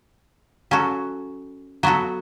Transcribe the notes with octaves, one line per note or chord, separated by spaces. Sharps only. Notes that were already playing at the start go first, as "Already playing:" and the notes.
F#3 C#4 F#4 A4
F#3 B3 F#4 A4